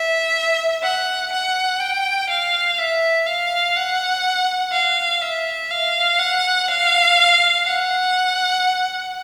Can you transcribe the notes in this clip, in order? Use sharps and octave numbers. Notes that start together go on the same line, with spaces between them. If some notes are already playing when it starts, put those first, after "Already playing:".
Already playing: E5
F#5
F#5
G5
F5
E5
F5
F#5
F5
E5
F5
F#5
F5
F#5